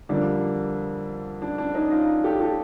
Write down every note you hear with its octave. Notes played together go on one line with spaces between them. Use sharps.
F2 D3 G3 A#3 D4
D4
D4
C#4 D#4
D#4 F4
G4 A4
G4 A4